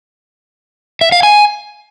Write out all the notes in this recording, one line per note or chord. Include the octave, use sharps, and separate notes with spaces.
E5
F5
G#5